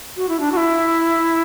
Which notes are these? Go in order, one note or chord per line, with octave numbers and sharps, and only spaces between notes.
F#4
E4
D4
F#4
E4